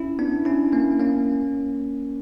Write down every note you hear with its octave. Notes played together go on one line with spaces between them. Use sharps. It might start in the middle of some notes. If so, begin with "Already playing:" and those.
Already playing: C#4 E4
B3 D4
C#4 E4
A#3 C#4
A#3 C#4